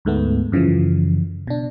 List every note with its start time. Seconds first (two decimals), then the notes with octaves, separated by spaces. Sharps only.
0.05 D2 G#2 A3 B3
0.52 F#2 C#3 E3 F3
1.47 B2 D4